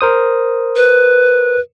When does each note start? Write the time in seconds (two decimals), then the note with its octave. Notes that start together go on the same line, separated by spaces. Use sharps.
0.01 A#4 C5 D#6
0.76 B4